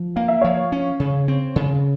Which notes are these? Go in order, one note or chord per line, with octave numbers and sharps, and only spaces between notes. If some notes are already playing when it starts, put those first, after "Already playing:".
Already playing: F3
A#3 F5
E5
F3 C#5 F5
C#4
C#3
C4
C#3